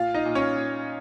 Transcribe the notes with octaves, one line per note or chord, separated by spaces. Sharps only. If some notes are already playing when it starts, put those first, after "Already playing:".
Already playing: A#2 F4 F5
D#4 D#5
A#2
C#4 C#5
A#2